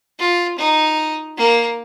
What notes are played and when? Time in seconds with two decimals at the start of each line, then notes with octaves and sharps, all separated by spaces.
0.19 F4
0.58 D#4
1.38 A#3